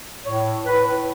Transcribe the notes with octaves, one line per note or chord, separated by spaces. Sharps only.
A2 C#5
A2 B4